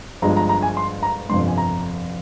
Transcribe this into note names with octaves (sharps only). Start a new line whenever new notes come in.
G1 G2 F3 G#3 A#5
A#5
A#5
G#5
C6
A#5
G1 F2 C3 C6
G#5
A#5